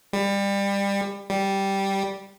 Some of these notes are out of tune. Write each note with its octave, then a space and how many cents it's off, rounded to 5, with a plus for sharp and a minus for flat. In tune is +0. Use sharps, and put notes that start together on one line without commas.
G3 +25
G3 -5